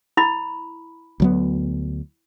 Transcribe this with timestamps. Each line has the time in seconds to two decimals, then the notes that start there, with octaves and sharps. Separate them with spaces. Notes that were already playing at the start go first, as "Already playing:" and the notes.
0.17 E4 B5
1.20 D2 F#3 B3